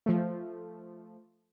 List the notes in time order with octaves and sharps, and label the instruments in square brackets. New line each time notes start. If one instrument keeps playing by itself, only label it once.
[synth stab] F3 A3